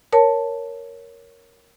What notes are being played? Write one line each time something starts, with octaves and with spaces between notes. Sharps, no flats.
A#4 C#5 A5